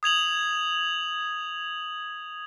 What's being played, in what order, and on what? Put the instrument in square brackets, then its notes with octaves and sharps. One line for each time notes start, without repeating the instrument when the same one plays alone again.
[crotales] D#6 G#6 F7 F#7